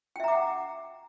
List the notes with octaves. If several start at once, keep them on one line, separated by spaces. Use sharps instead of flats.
E5 F#5 G5 A#5 D6